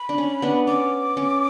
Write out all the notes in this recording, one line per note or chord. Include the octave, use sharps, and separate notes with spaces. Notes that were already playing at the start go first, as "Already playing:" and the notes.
Already playing: B5
D4
C#4
B3 D4
C#4 D6
C#4